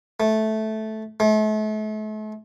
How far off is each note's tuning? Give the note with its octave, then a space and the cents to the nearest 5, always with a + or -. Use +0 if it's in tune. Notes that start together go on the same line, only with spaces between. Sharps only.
A3 -10
A3 -40